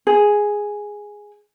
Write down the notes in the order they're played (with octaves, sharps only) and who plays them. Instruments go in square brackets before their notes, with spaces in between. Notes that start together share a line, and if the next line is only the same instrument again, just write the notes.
[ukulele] G#4